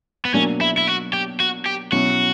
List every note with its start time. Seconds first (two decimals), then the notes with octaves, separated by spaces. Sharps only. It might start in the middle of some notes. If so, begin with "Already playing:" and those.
0.25 B3
0.34 B2 F#3 A#3 C#4 D4
0.61 E4
0.78 E4
0.87 F#4
1.13 G4
1.40 F#4
1.66 G4
1.92 B2 F#3 C#4 E4 F#4